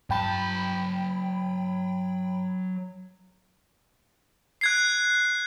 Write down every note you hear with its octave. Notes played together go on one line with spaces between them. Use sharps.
G2 F#3 G5 A5 B5
F#6 G#6 C7